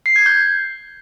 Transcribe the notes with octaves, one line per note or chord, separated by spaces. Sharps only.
C7
G#6
G6